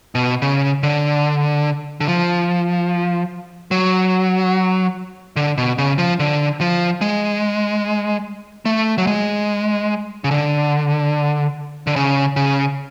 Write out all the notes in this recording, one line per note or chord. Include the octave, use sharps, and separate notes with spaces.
B2
C#3
D3
D3
F3
F#3
D3
B2
C#3
F3
D3
F3
G#3
A3
F#3
G#3
C#3
D3
D3
C#3
C#3